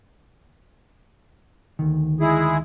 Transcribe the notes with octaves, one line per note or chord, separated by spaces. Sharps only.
D2 D#3
G#3 E4 G#4